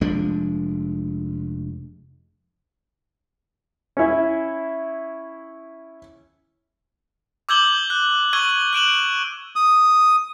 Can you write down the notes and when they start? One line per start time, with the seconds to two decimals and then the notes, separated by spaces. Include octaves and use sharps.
0.01 F1 F3 G#3 D4
3.97 C#4 E4
7.49 D6 E6 G6 G#6 F#7 G7
7.90 F#6
8.33 C#6 E6 G#6 D#7 F#7 G7
8.73 F#6 D7 E7 F#7
9.56 D#6